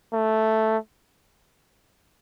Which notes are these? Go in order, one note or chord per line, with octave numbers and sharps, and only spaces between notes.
A3